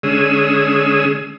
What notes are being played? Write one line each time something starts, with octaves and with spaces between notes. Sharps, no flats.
D3 G#3 C#4 G#4 D#6 E6